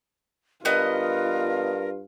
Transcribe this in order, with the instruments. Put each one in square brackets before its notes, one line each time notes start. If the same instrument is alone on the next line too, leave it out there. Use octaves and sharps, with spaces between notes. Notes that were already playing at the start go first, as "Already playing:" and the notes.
[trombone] G2 [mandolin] B3 D#5 [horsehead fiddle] F4 [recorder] A#4